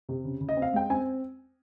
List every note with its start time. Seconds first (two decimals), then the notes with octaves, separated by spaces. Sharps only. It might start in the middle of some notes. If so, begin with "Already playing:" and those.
0.09 C3
0.25 C#3
0.41 C#3
0.49 D#5
0.57 C4
0.62 F5
0.73 G#3 G5
0.90 C4 G#5